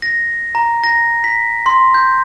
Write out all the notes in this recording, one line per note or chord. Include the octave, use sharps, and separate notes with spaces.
A#6
A#5
A#6
B6
C6
G6